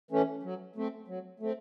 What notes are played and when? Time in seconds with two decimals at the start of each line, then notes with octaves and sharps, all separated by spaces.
0.11 E3 A3 C#4
0.43 F#3
0.76 A3 C4
1.08 F#3
1.40 A3 C4